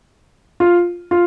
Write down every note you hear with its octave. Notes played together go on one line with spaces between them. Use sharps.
F4
F4